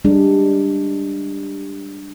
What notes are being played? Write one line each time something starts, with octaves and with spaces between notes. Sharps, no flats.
G3 G#3 D4